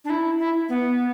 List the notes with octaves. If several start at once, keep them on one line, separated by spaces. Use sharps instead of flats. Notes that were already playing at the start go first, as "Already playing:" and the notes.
D4
E4
E4
B3